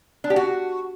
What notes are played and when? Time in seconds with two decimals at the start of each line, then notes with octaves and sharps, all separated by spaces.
0.24 D4
0.30 G4
0.36 F#4